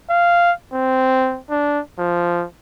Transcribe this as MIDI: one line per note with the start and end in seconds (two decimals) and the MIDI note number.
0.10 0.52 77
0.73 1.39 60
1.50 1.80 62
1.99 2.46 53